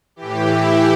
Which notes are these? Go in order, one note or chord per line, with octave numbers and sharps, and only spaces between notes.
A2 E3 G4
E4